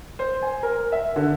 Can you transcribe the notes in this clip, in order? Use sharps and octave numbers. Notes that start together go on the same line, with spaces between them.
C5
G#5
A#4
E5
D3